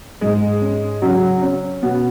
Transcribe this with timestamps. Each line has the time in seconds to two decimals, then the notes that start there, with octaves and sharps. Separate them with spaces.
0.21 G#2 G#3
0.61 C#4
1.02 C#3 F#3
1.42 C#4
1.82 B2 B3